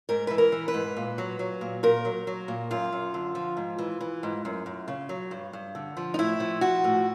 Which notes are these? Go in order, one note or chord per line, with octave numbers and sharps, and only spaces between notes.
G#2 A#4
E3 B4
A#4
E3
B4
G#2
A#2
F#3
F#3
A#2
A#2 A#4
F#3
F#3
A#2
F#2 F4
F#2
D3
F3
G#2
E3
E3
G#2
F#2
F#2
C#3
F#3
G2
G2
D3
F3
D#4
A2 E4
F3
F3 F#4
A2